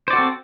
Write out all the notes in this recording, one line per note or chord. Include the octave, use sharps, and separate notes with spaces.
C4 F#4 A4 C5 D5